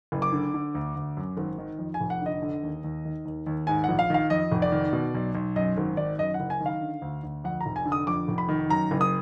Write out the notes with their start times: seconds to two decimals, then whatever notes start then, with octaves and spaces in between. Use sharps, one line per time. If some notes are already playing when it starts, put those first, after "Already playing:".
0.12 F#1
0.22 D6
0.32 D3
0.54 D3
0.75 D2
0.96 D2
1.17 F#2
1.37 G#1
1.58 D#3
1.79 F2
1.94 G#5
2.01 F1
2.10 F#5
2.22 D3 D#5
2.42 D3
2.63 D#2
2.84 D#2
3.05 D#3
3.25 D#2
3.46 D#2
3.67 G#2 G#5
3.84 A#1 F#5
3.99 F5
4.10 D#3 F5
4.30 F2 D#5
4.52 F1
4.62 D5
4.72 D#3
4.93 B2
5.15 B1
5.35 B1
5.56 F#2 D#5
5.77 G#1
5.97 D#3 D5
6.18 F#2 D#5
6.34 F#5
6.40 F#1
6.50 G#5
6.61 D#3
6.66 F5
6.81 D3
7.02 D2
7.23 D2
7.44 F2 F#5
7.60 A#5
7.66 F1
7.76 G#5
7.86 D3
7.92 D#6
8.07 F2 D6
8.28 F1
8.38 B5
8.49 D#3
8.69 F#2 A#5
8.91 F#1
9.01 D#6